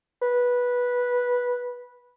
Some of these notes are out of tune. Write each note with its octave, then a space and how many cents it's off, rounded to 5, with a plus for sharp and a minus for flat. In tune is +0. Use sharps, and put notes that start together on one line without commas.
B4 -10